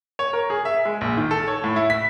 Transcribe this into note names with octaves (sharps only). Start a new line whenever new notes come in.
C#5
A#4
G#4
E5
G#3
A#1
D#3
A4
C#5
A2
E4
B6